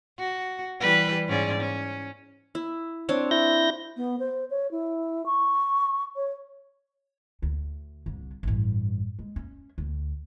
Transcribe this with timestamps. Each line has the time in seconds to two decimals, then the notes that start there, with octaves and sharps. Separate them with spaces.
0.19 F#4
0.81 E3 G3 B4
1.29 G#2 C#4 D5
1.60 C#4
2.55 E4
3.09 C4 D4 C#5
3.31 E4 G6 A#6
3.97 B3
4.19 C5
4.50 C#5
4.71 E4
5.26 C#6
6.16 C#5
7.42 D2
8.06 C2 D3
8.43 A1 G2
9.19 G#3
9.36 C#4
9.78 D2